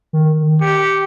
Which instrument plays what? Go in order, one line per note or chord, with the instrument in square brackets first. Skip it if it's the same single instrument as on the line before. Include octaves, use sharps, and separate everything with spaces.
[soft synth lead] D#3
[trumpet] G4 [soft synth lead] C#7